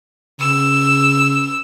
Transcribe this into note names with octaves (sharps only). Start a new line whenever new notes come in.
C#3 E6